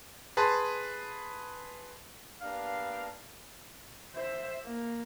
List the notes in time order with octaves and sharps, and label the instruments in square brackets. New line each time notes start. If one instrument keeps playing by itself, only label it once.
[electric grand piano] G#4 B4 A5 C6
[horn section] A#3 B3 D4 G4 F5
[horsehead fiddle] C5 E5
A#3